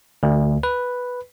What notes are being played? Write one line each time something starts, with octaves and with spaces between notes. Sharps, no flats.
D2
B4